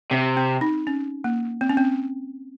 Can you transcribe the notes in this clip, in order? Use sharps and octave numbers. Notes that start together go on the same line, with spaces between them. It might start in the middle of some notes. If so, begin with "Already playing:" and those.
C3 C4
C4
D#4
C#4
A#3
C4
C#4
C4